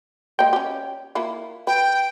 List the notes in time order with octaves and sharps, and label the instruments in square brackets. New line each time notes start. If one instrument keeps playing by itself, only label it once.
[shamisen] G#3 A#3 [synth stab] G5
[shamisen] C#4 G4
A#3 E4 F4
[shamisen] B4 [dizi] G5